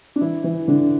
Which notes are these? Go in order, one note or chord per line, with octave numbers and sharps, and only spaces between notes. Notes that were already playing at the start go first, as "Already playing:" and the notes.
D4
E3 E4
E3 E4
D3 D4